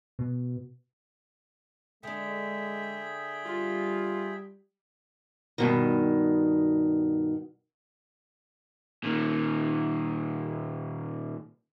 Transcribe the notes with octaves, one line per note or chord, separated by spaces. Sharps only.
B2
D3 G#3 D4 G#4 E5 G5
G3 F4
G2 B2 D#3
A#2 D#3